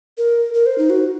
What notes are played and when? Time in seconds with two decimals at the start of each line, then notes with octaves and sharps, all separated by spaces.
0.18 A#4
0.54 A#4
0.66 C5
0.78 D#4
0.90 F#4